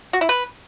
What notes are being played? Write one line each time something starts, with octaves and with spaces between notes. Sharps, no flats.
F#4
E4
B4